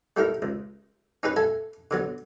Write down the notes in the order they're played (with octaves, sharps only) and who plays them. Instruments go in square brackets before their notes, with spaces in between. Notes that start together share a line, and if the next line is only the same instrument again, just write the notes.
[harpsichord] G3 A3 E4 A#4
C#2
C#4 D#4 G#4 B4
A4 E5 G#5
D3 F#3 B3